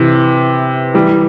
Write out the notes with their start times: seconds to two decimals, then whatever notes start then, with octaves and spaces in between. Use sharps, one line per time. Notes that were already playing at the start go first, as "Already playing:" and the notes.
Already playing: C3 E3
0.94 E3 G3